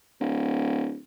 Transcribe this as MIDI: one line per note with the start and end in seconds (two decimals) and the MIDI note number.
0.20 0.97 26